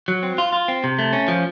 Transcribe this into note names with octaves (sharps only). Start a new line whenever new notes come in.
F#3
C4
F4
F4
C4
C3
A3
C#4
F3